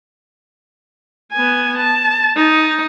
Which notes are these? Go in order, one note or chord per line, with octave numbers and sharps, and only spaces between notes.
B3 G#5
A5
D#4